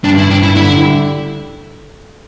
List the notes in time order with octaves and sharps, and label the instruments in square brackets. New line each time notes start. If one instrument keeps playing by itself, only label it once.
[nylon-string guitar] G2 [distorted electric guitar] D4
[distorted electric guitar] E4
[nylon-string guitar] G2 [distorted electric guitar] D4
[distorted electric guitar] E4
[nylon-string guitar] D3 [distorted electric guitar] E4
[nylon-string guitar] G3